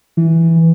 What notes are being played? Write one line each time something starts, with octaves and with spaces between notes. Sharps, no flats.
E3